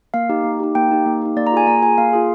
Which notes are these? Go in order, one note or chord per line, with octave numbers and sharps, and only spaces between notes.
A#3 F5
D#4 G4
A#3
D#4 G4
A#3 G5
D#4 G4
A#3
D#4 G4
A#3 D5
A#5
F4 G#4 G#5
A#3 A#5
F4 G#4 G#5
A#3 F5
F4 G#4